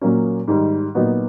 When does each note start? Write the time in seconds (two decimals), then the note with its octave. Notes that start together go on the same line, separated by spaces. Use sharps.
0.01 A#2 F#3 A#3 C#4
0.48 G#2 D#3 G3
0.95 A#2 F#3 B3 D#4 F#4